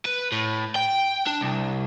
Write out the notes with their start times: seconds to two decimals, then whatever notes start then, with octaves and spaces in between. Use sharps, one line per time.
0.05 B4
0.32 A2
0.75 G5
1.27 D4
1.41 C2